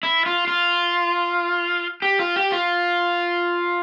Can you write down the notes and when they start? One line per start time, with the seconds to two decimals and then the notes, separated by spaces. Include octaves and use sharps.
0.03 E4
0.26 F4
0.48 F4
2.02 G4
2.20 F4
2.36 G4
2.52 F4